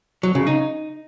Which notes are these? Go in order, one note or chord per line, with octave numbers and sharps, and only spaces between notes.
F#3
C#3
D#4